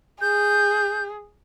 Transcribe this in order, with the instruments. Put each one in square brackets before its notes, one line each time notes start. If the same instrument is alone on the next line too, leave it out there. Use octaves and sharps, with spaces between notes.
[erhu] G#4 [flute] G6